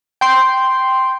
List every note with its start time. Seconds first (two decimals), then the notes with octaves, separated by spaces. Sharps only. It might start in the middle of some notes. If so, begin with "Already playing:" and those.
0.21 G5 C6